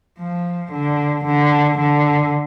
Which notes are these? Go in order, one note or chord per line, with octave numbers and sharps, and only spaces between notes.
F3
D3
D3
D3